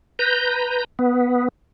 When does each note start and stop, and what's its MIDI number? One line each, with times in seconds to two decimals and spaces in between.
0.19 0.84 71
0.19 0.84 82
0.19 0.84 91
0.99 1.48 59